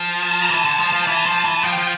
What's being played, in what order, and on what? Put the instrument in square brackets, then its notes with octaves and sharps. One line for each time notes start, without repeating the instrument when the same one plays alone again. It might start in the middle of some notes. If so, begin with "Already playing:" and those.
Already playing: [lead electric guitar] F3
[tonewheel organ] A5
A#5
[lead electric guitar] E3 [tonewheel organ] A5
[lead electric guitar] D3
F3
F3
E3
F3
E3
[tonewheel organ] A5
[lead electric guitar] F3 [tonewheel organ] G5
[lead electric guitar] F3